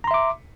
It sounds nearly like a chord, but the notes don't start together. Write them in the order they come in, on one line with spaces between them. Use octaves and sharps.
A#5 C6 E5 D6